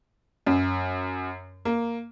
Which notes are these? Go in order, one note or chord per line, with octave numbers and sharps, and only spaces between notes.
F#2
A#3